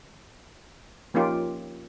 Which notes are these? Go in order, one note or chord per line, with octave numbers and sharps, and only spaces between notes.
F3 A#3 C#4 D#4 F4 G4